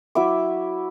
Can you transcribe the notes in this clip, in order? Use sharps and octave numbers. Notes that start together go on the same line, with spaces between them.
F#3 E4 E5 D6